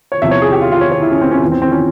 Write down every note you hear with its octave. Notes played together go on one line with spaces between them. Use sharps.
C#5
E2 C3 F3 E5
C#5
G#4
G4
F4
F4
C#5
C#5
E4
C#4
C4
C#4
E2 E3
C4
C4
C#4